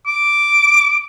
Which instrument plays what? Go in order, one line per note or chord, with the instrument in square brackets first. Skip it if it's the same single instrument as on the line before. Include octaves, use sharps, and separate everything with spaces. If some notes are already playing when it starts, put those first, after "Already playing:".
[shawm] D6